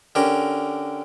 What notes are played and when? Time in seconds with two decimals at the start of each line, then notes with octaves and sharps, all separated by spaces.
0.15 D3 C#4 G4 A#4